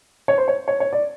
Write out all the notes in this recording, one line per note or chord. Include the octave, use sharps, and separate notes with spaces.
C#5
C5
C#5
C#5
C#5
D5